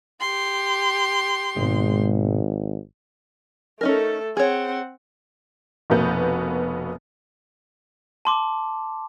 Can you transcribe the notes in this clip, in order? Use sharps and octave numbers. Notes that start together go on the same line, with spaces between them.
G4 C6
G#1 G#2 B2 G#3
A3 C#4 D#4 A4 A#4
C4 G#4 C#5 F#5
F1 B2 A#3 B3 G6
A5 C6 D6